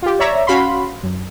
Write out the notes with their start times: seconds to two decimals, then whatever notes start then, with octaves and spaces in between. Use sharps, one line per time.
0.02 F4 G4
0.19 C#5 D5 E5 A#5
0.47 C#4 F#4 F5 B5 C6
1.03 F#2